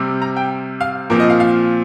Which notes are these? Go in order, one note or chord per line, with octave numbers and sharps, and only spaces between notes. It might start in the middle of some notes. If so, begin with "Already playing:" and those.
Already playing: C3 G3 C4
A#5
G5
F5
A#2 F3 C4 A#4
D#5
F5
F5